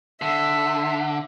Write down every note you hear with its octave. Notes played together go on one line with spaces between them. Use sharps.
D3 E5